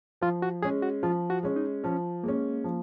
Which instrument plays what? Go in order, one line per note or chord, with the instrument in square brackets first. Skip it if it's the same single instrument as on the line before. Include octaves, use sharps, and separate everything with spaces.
[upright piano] F3 [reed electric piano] F4
[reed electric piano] F#4
[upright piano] G#3 C#4 [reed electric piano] G#4
[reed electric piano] F#4
[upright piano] F3 [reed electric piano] F4
[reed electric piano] F#4
[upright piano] G#3 C#4
[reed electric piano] D#4
[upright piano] F3 [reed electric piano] C#4
[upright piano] G#3 C#4 [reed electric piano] A#3
[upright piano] F3